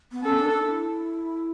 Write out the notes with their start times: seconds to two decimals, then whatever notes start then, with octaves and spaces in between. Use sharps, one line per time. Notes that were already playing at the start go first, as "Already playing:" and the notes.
0.12 B3
0.23 C#4 A4
0.36 D4
0.50 D4
0.63 E4